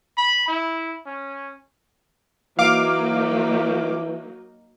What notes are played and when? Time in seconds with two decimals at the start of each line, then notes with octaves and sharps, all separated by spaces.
0.17 B5
0.48 E4
1.06 C#4
2.59 E3 F#3 A#3 D#4 F5 D6